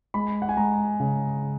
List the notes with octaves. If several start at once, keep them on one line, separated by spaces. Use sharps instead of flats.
G#3 B5
F#5
G#5
G#3 A#5
C#3